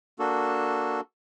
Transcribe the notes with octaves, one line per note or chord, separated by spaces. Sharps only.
A#3 D4 F#4 A4